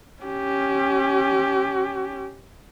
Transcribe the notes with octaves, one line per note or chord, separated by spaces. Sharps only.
C#4 G4